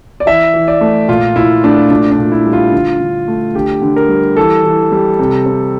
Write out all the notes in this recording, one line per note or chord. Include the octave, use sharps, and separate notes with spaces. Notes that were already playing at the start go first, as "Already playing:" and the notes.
D5
E3 E5
E3
D5
A3
A#2 F4
A#2 E4
A3 D4
A#2 D4
D4
A#2
E4
G3
F4
D3
D3
A3
D3 G4
D3
A#4
G3
E3 A4
E3
G3
C3
C4